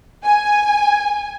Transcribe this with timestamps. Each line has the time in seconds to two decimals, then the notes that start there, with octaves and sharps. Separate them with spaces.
0.24 G#5